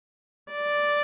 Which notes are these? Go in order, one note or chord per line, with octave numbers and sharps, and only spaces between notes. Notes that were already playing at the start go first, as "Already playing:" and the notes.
D5